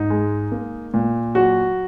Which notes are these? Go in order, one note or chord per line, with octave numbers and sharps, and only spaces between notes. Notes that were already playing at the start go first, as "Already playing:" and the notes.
Already playing: G#2 D#4
G#3
A#3
A#2
F#3 F#4